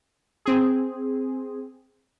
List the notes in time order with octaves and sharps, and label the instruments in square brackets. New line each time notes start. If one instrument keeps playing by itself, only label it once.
[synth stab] C4 G#4